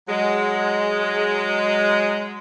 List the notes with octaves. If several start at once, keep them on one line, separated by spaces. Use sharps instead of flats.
F#3 G#3